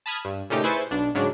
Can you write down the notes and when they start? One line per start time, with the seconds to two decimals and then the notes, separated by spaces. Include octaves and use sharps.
0.06 A5 B5 D#6 F6 G#6
0.25 G2
0.50 A#2 C#3 A3 D#4 G4
0.64 E4 G#4 B4 C5 C#6 A6
0.91 B1 D4
1.14 G#2 C#3 F#3 D4